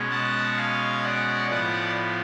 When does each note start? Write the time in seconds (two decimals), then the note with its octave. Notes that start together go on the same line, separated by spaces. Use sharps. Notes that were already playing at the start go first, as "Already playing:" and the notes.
Already playing: B2 G#3 C#4
0.11 F#5 A5
0.57 F5 G#5
1.03 D5 F#5
1.49 A2 F3 B3 D5 F#5